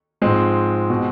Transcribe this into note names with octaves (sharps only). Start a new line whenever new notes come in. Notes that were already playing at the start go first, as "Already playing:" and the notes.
G#2 F3 G#3 C4
B2